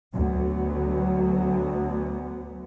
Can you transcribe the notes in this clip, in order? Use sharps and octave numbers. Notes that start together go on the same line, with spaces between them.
D2 F#3 B3